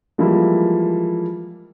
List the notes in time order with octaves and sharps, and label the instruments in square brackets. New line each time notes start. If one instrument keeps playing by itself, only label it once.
[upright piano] E3 F3 G3 G#3 A#3 E4